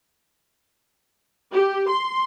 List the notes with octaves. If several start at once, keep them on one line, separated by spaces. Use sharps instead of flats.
G4
C6